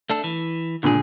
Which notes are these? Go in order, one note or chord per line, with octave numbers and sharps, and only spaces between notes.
A3 D4 A4
E3
C#2 A#2 D3 G#4